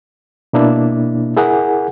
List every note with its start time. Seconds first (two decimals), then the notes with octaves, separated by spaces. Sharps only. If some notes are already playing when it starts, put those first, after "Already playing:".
0.53 B2 A#3 D4 E4
1.37 E4 G#4 A#4 F#5 G#5